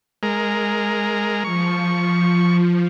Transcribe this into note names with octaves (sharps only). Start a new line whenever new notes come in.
G#3 A#4
F3 C#6